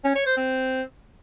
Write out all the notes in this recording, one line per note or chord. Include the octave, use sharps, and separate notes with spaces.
C#4
C#5
C5
C4